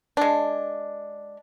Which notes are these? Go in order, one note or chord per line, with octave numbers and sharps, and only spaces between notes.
G#3 D4